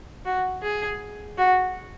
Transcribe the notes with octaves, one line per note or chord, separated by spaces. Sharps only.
F#4
G#4
F#4